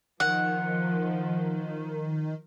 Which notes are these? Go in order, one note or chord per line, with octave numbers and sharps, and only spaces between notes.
D#3 F3 F#5